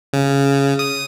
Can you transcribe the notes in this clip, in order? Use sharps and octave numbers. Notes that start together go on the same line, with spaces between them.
C#3
D#6